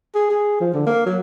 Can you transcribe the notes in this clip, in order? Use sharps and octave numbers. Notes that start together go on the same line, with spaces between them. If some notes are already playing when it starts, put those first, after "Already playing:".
G#4
G#4
F3
D3
A#3
F#3